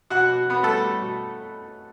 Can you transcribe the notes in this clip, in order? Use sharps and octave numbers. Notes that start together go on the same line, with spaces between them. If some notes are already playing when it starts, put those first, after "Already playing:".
B2 F#4 F#5
B2
B2 B3 B4
G3 A3 A4
G3
B2